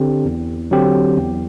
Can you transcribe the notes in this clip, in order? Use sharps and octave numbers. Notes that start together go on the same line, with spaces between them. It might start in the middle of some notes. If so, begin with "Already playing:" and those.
Already playing: D3 C4 G4
E2
D3 F#3 C4 G4
E2